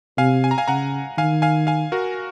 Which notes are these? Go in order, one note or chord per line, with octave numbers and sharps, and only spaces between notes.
C3 F5 G#5
G#5
A#5
F5 G#5
C#3 F#5 A#5
D#3 F5 G#5
F5 G#5
F5 G#5
F#4 A#4